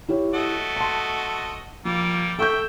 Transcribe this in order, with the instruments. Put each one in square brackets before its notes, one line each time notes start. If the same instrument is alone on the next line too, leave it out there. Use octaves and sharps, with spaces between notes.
[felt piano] E4 G4 C#5
[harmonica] A3 F#4 D#5
[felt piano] A5 C6
[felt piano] F3 [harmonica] G3 A#3
[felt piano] A4 C#6 G6 [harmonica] E5 G5